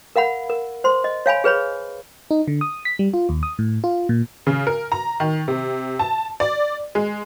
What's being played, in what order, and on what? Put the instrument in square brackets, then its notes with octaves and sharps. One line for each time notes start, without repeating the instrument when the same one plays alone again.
[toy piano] A#4 F5 F#5 B5
A#4
C5 C6
D#5
C#5 F5 G#5 B5
G#4 B4 C#5 B5
[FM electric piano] D#4
D3
D#6
B6
G3
F4
D#2
D#6
A2
F4
A#2
[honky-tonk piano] C#3
A#4
A#5
D#3
C3
A5
D5
G#3